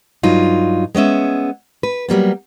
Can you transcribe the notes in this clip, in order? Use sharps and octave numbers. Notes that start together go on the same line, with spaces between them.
G2 F#3 D#4 F4
G#3 B3 C#4 E5
B4
F#3 G3 A#3 B3